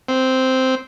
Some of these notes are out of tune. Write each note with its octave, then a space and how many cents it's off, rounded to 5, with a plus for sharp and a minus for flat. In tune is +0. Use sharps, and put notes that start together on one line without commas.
C4 -5